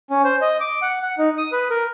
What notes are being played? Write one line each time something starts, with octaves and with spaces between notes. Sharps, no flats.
C#4
C5
D#5
D6
F#5
F#5
D#4
D#6
B4
A#4